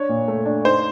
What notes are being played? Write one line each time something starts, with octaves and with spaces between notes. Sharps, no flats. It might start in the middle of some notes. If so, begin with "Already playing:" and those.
Already playing: D4 C#5
A#2
A3
D4
D#4 C5